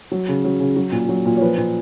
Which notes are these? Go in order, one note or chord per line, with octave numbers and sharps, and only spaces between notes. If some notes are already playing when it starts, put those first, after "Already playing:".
F#3
C#3
F#3
C#3
F#3
A#2
F#3
A#2
C#5
F3 B4
A#2